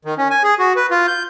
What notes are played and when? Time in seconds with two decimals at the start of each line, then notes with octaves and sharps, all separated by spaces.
0.05 D#3
0.18 C#4
0.31 G#5
0.44 G#4
0.59 F#4
0.76 B4
0.91 F4
1.08 G6